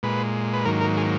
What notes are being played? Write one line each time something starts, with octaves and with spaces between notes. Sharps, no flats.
A#2 G#3 B4
B4
G#2 D#3 F#3 A#3 A#4
A#4
G#4